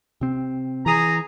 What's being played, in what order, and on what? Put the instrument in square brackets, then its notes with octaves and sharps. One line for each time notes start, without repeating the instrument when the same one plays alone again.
[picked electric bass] C3 C4
[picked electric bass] E3 [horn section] G#4 A#5